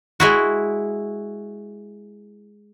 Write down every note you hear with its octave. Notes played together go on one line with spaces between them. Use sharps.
G#3 E4 F#4